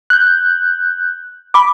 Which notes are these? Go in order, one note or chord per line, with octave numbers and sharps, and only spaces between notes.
F#6 G6
B5 D6